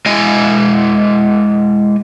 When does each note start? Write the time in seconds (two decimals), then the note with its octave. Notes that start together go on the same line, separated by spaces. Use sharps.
0.06 G#3 E4 D#5 G#5